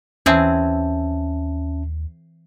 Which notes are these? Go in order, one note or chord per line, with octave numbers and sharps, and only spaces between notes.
D#2 E3 C4 C#4 G#4 E5 A5